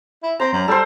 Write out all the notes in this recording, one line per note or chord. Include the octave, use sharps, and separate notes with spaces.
E4
C4 A#5
F#2
G3 A4 C5